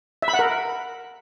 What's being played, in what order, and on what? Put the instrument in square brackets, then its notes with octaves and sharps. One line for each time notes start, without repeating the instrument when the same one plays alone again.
[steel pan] E5
B5
F#5
A#4